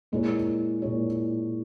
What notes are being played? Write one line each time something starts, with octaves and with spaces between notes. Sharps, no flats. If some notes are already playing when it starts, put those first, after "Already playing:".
A#2 G#3 E4 A#4 C#5
A#2 G#3 E4 A#4 C#5